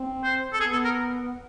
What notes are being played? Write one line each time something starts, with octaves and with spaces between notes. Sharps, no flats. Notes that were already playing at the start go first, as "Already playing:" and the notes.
Already playing: C4
C5
A4
B3 G#4
A4
A#4